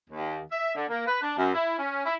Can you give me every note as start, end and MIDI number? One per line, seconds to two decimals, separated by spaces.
0.10 0.38 39
0.51 0.72 76
0.75 0.84 50
0.89 1.04 58
1.07 1.21 71
1.22 1.34 62
1.37 1.52 42
1.54 1.75 64
1.78 2.02 61
2.06 2.13 64